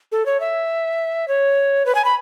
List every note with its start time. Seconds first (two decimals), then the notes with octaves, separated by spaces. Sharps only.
0.12 A4
0.26 C#5
0.40 E5
1.28 C#5
1.86 B4
1.95 G#5
2.05 B5